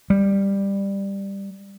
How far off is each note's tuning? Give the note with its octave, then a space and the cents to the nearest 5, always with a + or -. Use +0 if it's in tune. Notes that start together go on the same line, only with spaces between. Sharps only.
G3 +10